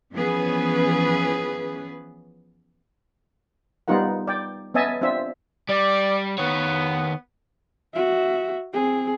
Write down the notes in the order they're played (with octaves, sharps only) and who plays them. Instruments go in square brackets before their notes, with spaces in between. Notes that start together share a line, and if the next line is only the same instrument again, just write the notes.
[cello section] E3 F3 B3 C#4 G#4 B4
[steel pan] G3 B3 D#4 F4 A#4 F#5
D5 G5
B3 C#4 D#5 E5 G#5 A5
C4 D4 F4 E5
[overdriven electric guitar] G3 [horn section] D5
[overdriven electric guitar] D#3 C#5 [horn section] B3
[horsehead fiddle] F#4 E5
C4 G#4